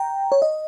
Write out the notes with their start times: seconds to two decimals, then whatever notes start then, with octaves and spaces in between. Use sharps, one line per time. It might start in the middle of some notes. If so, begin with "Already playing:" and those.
Already playing: G5 A#5
0.32 C#5
0.42 D#5